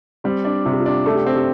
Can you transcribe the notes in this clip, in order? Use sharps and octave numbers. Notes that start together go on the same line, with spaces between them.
G3 C4
D4
C3 F4
G4
F4
D4
A3 A4
G4
C4 A4
G4